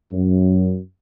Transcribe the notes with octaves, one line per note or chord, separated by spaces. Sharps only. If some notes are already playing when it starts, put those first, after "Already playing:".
F#2